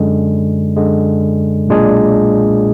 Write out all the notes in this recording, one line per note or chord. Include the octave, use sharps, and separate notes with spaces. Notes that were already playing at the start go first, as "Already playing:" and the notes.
Already playing: F#2 D3 G#3
F#2 D3 G#3
B1 A#2 G#3 D4 G#4